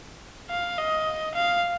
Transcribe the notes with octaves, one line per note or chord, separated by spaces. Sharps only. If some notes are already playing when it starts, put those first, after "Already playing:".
F5
D#5
F5